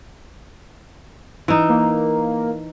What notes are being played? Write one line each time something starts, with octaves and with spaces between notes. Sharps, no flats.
E3 D#4
A#3